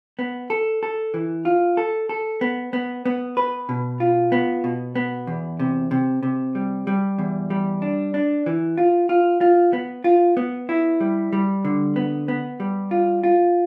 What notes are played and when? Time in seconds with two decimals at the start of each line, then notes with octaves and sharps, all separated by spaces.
0.19 B3
0.50 A4
0.83 A4
1.14 E3
1.45 F4
1.77 A4
2.09 A4
2.41 B3
2.73 B3
3.06 B3
3.37 B4
3.69 B2
4.00 F4
4.32 B3
4.64 B2
4.95 B3
5.27 E2
5.59 C3
5.91 C3
6.23 C3
6.55 G3
6.87 G3
7.18 E2
7.50 G3
7.82 D4
8.14 D4
8.46 E3
8.78 F4
9.09 F4
9.41 F4
9.73 B3
10.04 F4
10.37 B3
10.69 E4
11.00 G3
11.33 G3
11.65 D3
11.96 B3
12.28 B3
12.60 G3
12.91 F4
13.24 F4